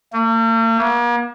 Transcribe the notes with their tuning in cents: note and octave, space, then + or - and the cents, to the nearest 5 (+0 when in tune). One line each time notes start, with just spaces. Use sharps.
A#3 -45
A#3 +45